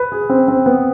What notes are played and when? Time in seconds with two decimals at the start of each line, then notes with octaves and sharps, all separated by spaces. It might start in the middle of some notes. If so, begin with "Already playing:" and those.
Already playing: B4
0.12 G#4
0.30 C4
0.48 C4
0.66 B3